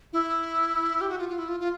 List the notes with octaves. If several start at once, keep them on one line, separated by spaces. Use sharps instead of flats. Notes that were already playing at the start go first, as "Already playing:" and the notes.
E4
G4
F#4
F4
F4
E4
F4
F4